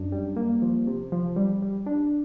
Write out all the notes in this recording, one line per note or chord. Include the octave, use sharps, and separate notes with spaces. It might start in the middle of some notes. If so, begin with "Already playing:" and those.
Already playing: F#2 D4
G3
A#3
F3
C3
F3
G3
G3
D4